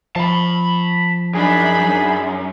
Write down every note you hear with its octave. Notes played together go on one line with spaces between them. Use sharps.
F3 A5 B5
F#2 D4 D#4 G#4 B5